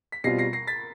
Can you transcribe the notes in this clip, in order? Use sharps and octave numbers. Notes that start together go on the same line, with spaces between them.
B6
B2 G3 C4 F4 A#6 C7
A#6 C7
A#6 C7
A6 B6